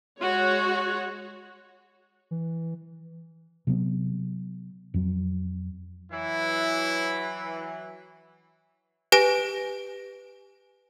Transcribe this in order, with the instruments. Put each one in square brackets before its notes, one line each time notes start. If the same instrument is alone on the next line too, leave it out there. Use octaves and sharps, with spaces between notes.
[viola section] G#3 F#4 C#5
[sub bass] E3
[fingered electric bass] C3 F#3 B3
F2 F#3
[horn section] E3 F#3 [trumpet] E4
[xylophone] G4 B4 G#5 A#6 D7